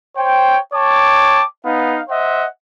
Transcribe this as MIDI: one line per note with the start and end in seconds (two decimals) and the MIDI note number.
0.16 0.57 72
0.16 0.57 73
0.16 0.57 79
0.73 1.44 73
0.73 1.44 79
0.73 1.44 81
0.73 1.44 86
1.65 2.00 59
1.65 2.00 63
1.65 2.00 77
2.09 2.45 72
2.09 2.45 75
2.09 2.45 76
2.09 2.45 78